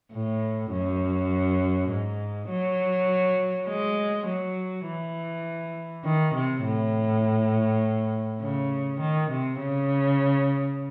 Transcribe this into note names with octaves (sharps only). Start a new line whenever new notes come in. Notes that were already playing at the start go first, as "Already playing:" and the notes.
A2
F#2
G#2
F#3
G#3
F#3
E3
D#3
C3
A2
C#3
D#3
C3
C#3